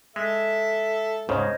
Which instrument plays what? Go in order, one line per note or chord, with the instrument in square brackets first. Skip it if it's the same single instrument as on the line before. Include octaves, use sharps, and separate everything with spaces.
[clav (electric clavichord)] G#3 [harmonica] A4 E5
[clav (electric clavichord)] G#2 C#3 [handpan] C5 C#5 D#5